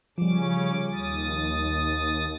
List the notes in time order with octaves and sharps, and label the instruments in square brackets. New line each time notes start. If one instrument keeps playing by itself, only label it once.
[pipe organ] C#3 C#4 D6 [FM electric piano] F3 G3
[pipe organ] D#2 D#6 A6